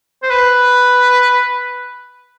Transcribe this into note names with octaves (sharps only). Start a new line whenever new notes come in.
C5
B4